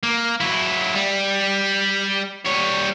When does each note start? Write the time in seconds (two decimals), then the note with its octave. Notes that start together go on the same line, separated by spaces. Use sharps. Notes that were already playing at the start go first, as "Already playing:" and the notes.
0.03 A#3
0.40 F#3 E4
0.95 G3
2.46 G3 C#5